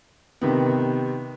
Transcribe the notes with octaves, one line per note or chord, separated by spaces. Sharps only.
C3 D#3 B3